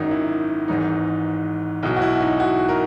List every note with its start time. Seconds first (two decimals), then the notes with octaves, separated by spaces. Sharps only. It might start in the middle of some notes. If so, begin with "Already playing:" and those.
Already playing: G#1 F#2 D#3 D#4
0.11 E4
0.68 G#1 G#2 E3 D#4
1.83 B1 B2 F#3 E4
1.97 F#4
2.02 E4
2.21 D#4
2.40 F#4
2.69 A#4